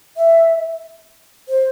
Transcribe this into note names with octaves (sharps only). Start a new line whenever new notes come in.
E5
C5